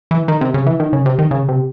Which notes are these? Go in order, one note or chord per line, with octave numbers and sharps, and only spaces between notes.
E3
D#3
C3
C#3
E3
D#3
C#3
C3
D#3
C#3
C3